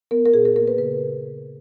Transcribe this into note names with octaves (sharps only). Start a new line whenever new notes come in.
B3 A#4
A#4
A#2 G#4
A#4
A#3 A#4
B4
C#3 B4